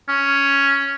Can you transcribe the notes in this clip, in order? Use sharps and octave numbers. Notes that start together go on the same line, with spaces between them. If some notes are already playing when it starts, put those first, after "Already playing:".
C#4